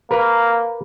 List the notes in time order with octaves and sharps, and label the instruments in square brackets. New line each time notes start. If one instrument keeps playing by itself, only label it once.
[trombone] A#3 [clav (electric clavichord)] A#4 B4